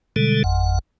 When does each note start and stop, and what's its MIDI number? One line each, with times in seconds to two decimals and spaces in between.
0.16 0.43 47
0.16 0.43 50
0.16 0.43 55
0.16 0.43 56
0.16 0.43 69
0.44 0.79 32
0.44 0.79 41
0.44 0.79 78